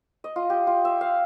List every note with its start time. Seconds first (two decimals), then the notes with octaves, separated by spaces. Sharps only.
0.24 D#5
0.36 F4
0.50 G4
0.67 F4
0.85 E5
1.01 F5